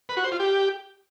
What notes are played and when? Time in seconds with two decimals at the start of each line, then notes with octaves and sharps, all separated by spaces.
0.09 B4
0.17 F#4
0.24 C5
0.32 F4
0.40 G4